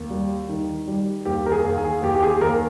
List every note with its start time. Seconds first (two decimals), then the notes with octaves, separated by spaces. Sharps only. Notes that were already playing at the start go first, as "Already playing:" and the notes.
Already playing: D#2
0.10 G3
0.49 D#3
0.88 G3
1.25 D#2 G4
1.46 A#4
1.52 G#4
1.65 D#2
1.78 G#4
2.03 D#2 G4
2.15 G4
2.23 G#4
2.41 D#2 A#4